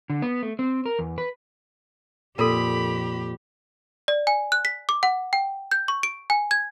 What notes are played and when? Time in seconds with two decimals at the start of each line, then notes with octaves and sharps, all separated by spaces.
0.10 D3
0.22 B3
0.43 A3
0.59 C4
0.86 A#4
0.99 E2
1.18 B4
2.39 F2 A#2 G4 A4 A#4 B5
4.08 D5
4.27 G#5
4.52 F#6
4.65 B6
4.89 D6
5.03 F#5
5.33 G5
5.71 G6
5.88 C#6
6.03 D7
6.30 G#5
6.51 G#6